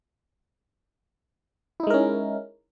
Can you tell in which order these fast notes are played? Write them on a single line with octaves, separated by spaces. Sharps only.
E4 D#4 G#3 A#4 C#4